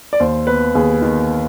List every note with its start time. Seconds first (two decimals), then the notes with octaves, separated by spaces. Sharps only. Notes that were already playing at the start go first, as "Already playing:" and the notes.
0.13 D5
0.20 D#2 C5
0.47 B3 B4
0.75 D#2 G#4
1.02 D#3